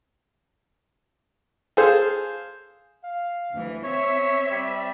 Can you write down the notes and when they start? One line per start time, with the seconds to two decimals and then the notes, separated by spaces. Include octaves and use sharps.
1.77 G#4 A4 C5 F5
3.04 F5
3.52 D2 E3
3.84 C4 C#5 E5
4.51 G3